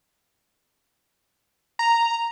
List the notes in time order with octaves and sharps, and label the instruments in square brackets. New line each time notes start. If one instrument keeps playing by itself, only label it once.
[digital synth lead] A#5